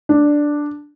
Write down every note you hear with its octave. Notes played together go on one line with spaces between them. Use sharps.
D4